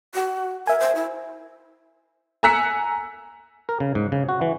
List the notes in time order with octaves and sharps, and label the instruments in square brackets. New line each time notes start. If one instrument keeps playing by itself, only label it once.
[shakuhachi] F#4
[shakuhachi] A#4 [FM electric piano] E5 G#5
[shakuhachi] C5
E4
[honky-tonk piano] G#5 A#5 E6 F#6 B6 C#7
[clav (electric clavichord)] A#4
C#3
G#2
C#3
F#4
E3